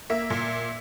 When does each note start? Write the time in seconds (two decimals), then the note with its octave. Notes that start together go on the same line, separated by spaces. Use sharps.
0.10 A#3 E5
0.30 A#2